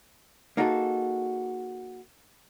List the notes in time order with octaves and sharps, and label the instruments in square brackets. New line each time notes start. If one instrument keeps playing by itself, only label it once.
[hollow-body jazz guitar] A#3 D#4 F#4 G#4 A4